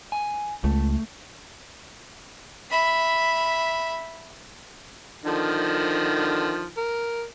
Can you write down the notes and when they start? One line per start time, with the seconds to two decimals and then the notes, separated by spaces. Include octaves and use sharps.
0.12 G#5
0.64 C#2 A3
2.70 E5 B5
5.25 D3 D#3 F3
6.77 A#4